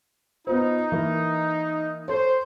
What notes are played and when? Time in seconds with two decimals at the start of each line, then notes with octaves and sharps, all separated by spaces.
0.47 B3 D#4 F4 C5
0.92 E3 A#3
2.08 A4 C5 C#5